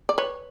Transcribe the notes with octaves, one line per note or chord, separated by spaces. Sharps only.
D5
B4 C#5